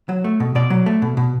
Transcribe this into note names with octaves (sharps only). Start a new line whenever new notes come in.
F#3
A3
B2
B2 D5
F#3
A3
B2
B2